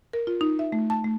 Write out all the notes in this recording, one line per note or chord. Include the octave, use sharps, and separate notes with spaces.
A#4
F4
D#4
E5
A3
A5
A3